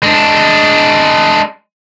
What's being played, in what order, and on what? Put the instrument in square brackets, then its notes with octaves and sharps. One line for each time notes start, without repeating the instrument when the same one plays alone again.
[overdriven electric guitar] G#3 D4